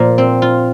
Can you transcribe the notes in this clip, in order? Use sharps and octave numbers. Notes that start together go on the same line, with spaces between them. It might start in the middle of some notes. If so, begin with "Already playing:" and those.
Already playing: A#2 F3
C4
F4